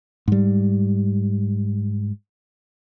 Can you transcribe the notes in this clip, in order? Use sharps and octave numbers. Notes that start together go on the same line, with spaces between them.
G#2 G3